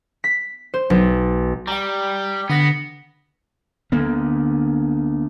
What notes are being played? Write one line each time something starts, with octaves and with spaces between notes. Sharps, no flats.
B6
C5
B1
G3 G5 A#5
D3 B3 F#5 A#6
D2 A#3 B3